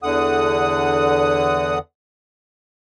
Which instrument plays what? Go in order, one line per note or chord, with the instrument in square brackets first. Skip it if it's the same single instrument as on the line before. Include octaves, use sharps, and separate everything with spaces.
[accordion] E2 D3 F#5 D#6